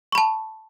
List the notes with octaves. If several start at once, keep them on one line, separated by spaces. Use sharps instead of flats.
A5 B5 C#6